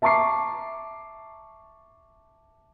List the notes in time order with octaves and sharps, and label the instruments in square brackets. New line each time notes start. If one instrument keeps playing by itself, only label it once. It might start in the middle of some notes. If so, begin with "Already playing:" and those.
[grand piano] E5 A5 A#5 C#6 D6 C7